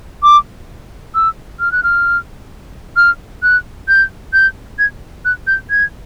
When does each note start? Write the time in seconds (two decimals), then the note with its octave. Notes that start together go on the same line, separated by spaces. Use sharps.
0.23 D6
1.15 E6
1.60 F6
1.72 F#6
1.83 F6
2.96 F6
3.43 F#6
3.88 G6
4.33 G6
4.79 G#6
5.25 F#6
5.47 G6
5.70 G#6